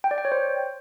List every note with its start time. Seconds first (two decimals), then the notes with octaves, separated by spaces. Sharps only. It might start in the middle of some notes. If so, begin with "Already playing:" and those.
0.04 G5
0.11 D5
0.18 G5
0.25 C#5
0.32 C5